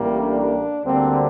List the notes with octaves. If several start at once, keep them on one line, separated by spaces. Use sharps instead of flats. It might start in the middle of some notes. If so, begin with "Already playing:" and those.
Already playing: A1 A2 G3 A#3
D4
D2 D3 G3 A#3 C4